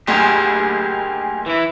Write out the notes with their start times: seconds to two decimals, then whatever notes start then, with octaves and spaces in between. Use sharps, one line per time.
0.07 F#1 D2 G4 G#4 A#4
1.46 E3 E4